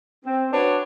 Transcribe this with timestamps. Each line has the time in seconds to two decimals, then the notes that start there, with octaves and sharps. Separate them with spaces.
0.24 C4
0.52 D4 F#4 B4 C#5